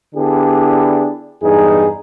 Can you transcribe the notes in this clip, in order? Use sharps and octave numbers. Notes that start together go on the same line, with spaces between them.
D3 B3 D4 E4 G4 G#4
E2 G2 D#4 G#4